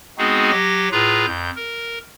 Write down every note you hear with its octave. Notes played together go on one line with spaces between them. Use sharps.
G#3 B3 C4 D#4 F#4 G#4
F#3 G4 A#6
A2 F4 G#4 B4 A#5
F2 G6
A#4